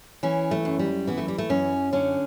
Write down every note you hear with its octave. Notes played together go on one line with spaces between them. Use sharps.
E3 C#4
A3
F#2
G3
E3 B3
A3
G3
A3
F#2 C#4
D3 C#4